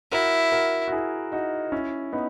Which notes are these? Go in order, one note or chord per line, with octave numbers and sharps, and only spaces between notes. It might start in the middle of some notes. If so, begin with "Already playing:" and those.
E4 F#4 A#4
F#4 A#4
F#4
E4 G#4
D#4 F#4
C#4 E4
B3 D#4